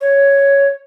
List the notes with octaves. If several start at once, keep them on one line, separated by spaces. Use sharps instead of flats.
C#5